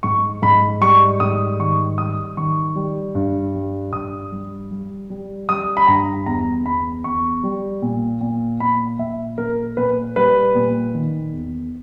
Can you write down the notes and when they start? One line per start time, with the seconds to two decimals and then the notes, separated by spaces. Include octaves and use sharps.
0.03 G#2 C#6
0.42 G#2 B5
0.81 G3 C#6
1.20 G#2 D#6
1.60 D#3 C#6
1.98 G3 D#6
2.37 D#3 C#6
2.76 G3
3.15 G2
3.55 G3
3.93 G2 D#6
4.32 G3
4.71 G3
5.10 G3
5.49 G3 D#6
5.77 B5
5.87 G2 A#5
6.26 E2 A#5
6.65 E2 B5
7.04 E2 C#6
7.43 G3
7.82 A#2
8.21 A#2
8.60 A#2 B5
8.99 A#2 E5
9.38 A#2 A#4
9.77 A#2 B4
10.16 G3 B4
10.55 A#2
10.95 D#3
11.33 E2